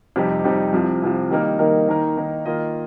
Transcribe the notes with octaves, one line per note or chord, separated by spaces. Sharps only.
F2 C3 G3 D#4 G4
F2 C3 G3 D#4 G4
C2 C3 F3
C2 C3 F3
D#3 G3 A#3 D#4 A#4
D#3 G3 A#3 D#4 A#4
D#3 A#3 D#4 A#4
D#3 A#3 D#4 A#4
D#3 A#3 F4 D#5